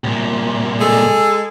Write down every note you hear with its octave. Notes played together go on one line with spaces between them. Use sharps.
C2 A#2
G#3 G#4 A4